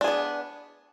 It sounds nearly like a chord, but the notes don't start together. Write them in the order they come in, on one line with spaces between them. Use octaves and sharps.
D4 G#4 B3